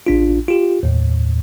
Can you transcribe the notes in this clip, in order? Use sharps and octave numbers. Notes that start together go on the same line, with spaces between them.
A1 D4 F4
F4 G4
D#2 A2